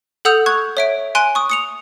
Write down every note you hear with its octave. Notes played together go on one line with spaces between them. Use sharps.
A4 F#5 D#6 E6 G6 F7
C#6 F#6 G#6
C#5 E5 D7
G#5 C6 F#6 D7 D#7
C#6 D#6
D#6 C#7 F7